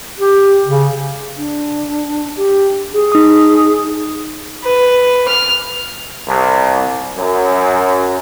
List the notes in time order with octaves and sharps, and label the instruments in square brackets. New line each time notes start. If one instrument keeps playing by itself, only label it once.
[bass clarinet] G4
C#3
[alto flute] D4
G4
G#4
[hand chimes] D#4 D#6
[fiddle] B4
F6
[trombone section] C2
F#2